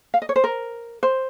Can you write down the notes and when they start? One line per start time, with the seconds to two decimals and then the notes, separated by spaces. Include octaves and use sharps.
0.14 F5
0.22 D#5
0.29 C#5
0.36 C5
0.44 A#4
1.03 C5